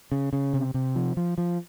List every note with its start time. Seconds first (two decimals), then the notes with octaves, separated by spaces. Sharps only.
0.12 C#3
0.33 C#3
0.53 C3
0.74 C3
0.96 F3
1.17 F3
1.38 F3